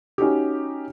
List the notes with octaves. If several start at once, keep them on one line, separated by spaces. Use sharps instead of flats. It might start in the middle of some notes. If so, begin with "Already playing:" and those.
C#4 D#4 F#4 G4